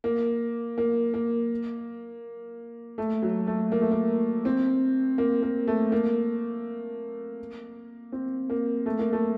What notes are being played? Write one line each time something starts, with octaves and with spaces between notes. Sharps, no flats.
A#3
A#3
A#3
A3
F#3
A3
A#3
A3
A#3
C4
A#3
A#3
A3
A#3
C4
A#3
A3
A#3
A3